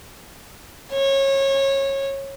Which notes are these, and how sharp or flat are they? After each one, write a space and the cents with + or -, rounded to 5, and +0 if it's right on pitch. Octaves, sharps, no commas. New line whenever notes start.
C#5 -25